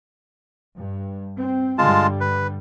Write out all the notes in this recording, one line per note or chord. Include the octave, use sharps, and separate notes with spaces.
G2
C4
G2 D3 G3 G#3 F4 A5
B4